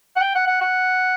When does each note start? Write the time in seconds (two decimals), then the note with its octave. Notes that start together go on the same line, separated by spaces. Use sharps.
0.16 F#5
0.21 G5
0.35 F#5
0.47 F#5
0.61 F#5